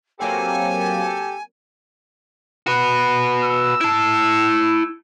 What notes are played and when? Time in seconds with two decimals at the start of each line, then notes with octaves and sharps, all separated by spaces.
0.20 F#3 A#3 C4 G4 A4 G#5
2.67 F#4 B4
3.43 E6
3.81 E4 A5